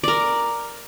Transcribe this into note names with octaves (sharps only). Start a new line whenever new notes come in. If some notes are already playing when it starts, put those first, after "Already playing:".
A#4 D5